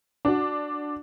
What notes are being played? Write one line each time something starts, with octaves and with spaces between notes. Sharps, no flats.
D4 F#4